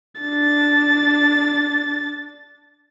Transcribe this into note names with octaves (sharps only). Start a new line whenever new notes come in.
D4 A6